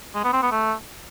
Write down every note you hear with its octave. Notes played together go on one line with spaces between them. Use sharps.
G#3
B3
C4
B3
A3